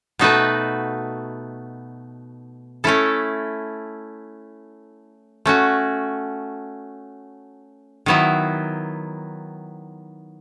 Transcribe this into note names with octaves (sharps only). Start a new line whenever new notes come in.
B2 A3 D#4 F#4 B4
A3 C#4 E4 A4
A3 C#4 F#4
D#3 F#3 B3 E4